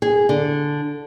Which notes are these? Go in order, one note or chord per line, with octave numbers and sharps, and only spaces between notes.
G#4
D3